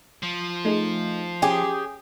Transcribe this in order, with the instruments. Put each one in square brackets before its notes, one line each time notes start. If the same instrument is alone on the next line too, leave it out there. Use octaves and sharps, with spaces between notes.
[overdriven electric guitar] F3
[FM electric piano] A3 D#4 G#4
[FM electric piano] C#4 [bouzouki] G4 G#4